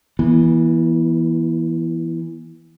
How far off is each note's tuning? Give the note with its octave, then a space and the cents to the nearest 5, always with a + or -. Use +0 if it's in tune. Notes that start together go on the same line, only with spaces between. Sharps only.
E3 +0 B3 -35